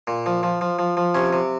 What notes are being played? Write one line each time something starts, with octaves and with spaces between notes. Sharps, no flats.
A#2
F3
F3
F3
F3
F3
C3 C#4
C3